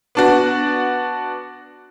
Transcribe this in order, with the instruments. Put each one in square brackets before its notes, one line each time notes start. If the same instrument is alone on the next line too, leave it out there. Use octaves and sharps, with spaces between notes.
[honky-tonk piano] B3 D4 F#4